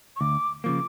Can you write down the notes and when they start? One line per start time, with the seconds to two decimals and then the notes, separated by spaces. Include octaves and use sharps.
0.16 C#6
0.20 D2 D6
0.64 C#3 F3 A#3 D6